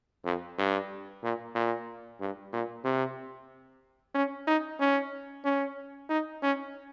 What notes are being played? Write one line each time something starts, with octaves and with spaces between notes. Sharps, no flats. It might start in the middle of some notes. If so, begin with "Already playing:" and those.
F2
G2
A#2
A#2
G2
A#2
C3
C#4
D#4
C#4
C#4
D#4
C#4